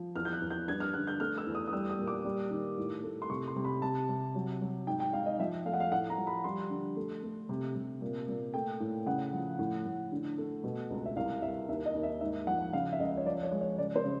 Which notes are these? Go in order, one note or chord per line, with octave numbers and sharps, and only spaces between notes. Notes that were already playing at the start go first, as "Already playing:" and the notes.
Already playing: F3
E2 F6
G6
F#6
E2
G6
G2 G#6
F6
D3 F#6
G6
A3 F6
E6
E2
D#6
D#6
G3 E6
D#6
A#2
D6
G3
D#3
A2
A3
C6
C3 C#6
C6
C3
B5
C3 A5
C3
F#3
F#3
G#2 G5
G5
G#2 F5
D#5
F3 E5
A3 F5
F#5
F5
A2 F#5
A#5
F3
B5
G3 C6
D3
A3
A3
C3
C3
A#2
A#2
A3 G5
A2
C#3 F#5
F3
A2
A2
D3
A3
B2
C#2
E5
C2 F5
C2 E5
D#2 E5
D#5
D#2
E5
G#2 E5
F3 F#5
C#3 F5
E5
C#2 D#5
C#5
F3 D5
C#5
G#3
C#5
C#3 D5
C5
C#3